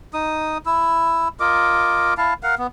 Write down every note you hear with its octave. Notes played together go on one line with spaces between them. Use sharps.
D#4 D#6
E4 E6
F4 A#4 D#5 D6
E4 F5 A5
A#4 F5 F#5
B3